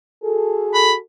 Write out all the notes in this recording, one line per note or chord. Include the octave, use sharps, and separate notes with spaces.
F#4 G#4 A4
B5